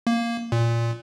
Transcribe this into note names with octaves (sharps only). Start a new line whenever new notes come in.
A#3
A#2